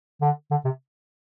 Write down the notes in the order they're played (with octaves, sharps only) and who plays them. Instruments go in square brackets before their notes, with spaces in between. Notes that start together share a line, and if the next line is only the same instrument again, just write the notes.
[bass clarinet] D3
D3
C3